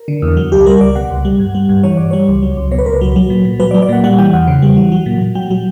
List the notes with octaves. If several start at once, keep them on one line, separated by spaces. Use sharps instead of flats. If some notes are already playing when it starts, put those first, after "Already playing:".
Already playing: A#4
D3
E2
F#3
C#2 G4
G3 A#4
C#2 D5
B2 F#5
C#2
G3
G2
G3
G2
E3 C#5
G2 D5
G3 C#5
C#2
F#3
C#2
B2 C#5
B4
C#2 A#4
B4
F#3
F#3
A#2
A#2
F#3 B4
D5
F#3
D5
A#2 F#5
G3 F#5
E3 G5
E2 F#5
C#3
G3
E3
F#3
A#2
A#2
F#3 G5
F#3